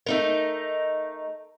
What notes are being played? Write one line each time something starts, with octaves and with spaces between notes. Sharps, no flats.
A3 D#4 A#4